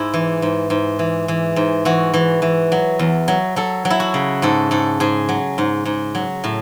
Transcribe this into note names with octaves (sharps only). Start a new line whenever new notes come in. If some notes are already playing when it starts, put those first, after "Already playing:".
Already playing: G#2 E4
E3
G#2
G#2
E3
E3
G#2
E3 F#4
E3
E3
F#3
E2
F#3
F#3 A4
F#3
E4
F#4
C#3
G#2 A4
G#2 A4
G#2 G#4
F#3
G#2
G#2
F#3
A2